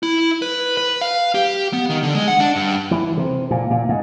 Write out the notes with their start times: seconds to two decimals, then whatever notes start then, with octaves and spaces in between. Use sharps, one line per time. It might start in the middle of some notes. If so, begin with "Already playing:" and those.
0.03 E4
0.42 B4
0.77 B4
1.01 F5
1.35 G4
1.73 B3
1.89 D#3
2.03 D3
2.15 G#3
2.28 F#5
2.40 D4
2.56 G2
2.91 E3
3.18 C3
3.51 A#2
3.71 A#2
3.89 G#2